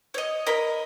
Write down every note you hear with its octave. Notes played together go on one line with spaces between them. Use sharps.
C#5 D#5
A#4 D#5 B5